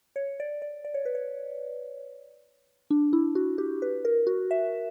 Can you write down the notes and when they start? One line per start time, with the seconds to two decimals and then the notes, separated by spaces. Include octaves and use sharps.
0.16 C#5
0.40 D5
0.62 D5
0.85 D5
0.94 C#5
1.05 B4
1.15 C#5
2.91 D4
3.13 E4
3.35 F#4
3.58 G4
3.82 B4
4.05 A#4
4.27 F#4
4.51 E5